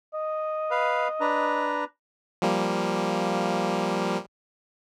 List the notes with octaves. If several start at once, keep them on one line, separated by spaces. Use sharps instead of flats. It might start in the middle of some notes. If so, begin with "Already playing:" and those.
D#5
B4 F5
D4 B4 A#5
F3 G3 A#3